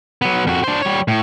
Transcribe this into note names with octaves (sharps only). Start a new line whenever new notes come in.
F#3 B3
F2 F#4
D4 C5
G3 C#5
A2